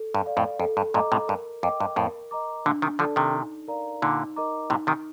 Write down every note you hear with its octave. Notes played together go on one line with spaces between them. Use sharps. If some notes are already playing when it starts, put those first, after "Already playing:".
Already playing: A4
G2
D5 F5
F2 A2
F2 A4
G2
G2 A#2 D#5 A#5 D6
A2 C3
G2 A#4
F2 D#5 G5 D6
G2
F2 A2 A#4
D#5 A#5 D6
A#2 D3 D4
C3 D#3
D3 F3 A4 D5 A5
C3 D#3
D#4
A#4 D5 F5 A#5
A#2 D3 D#4
A#4 D#5 A#5 D6
A2 C3 D#4
C3 D#3